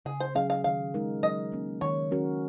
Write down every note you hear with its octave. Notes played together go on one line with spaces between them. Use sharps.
C#3 G#4
C5
F#3 C#4 G#4 F5
F5
D#3 F5
G#3 D#4 A#4
F#3 D#5
A#3 C#4
D#3 C#5
F#3 C#4 F#4 A#4